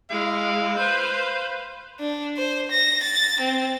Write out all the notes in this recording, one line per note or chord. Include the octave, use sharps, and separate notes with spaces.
G#3 E4 F5
B4 C5
D4
C5
A#6
A6
C4